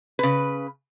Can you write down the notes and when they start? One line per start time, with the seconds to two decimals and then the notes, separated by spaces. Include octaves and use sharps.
0.19 C#3 B4